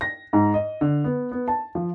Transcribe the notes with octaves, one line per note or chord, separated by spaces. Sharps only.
A#6
G#2
D#5
D3
B3
B3
A5
F3